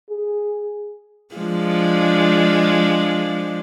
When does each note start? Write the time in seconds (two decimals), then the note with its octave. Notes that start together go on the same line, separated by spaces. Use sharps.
0.10 G#4
1.35 F3 G#3 D4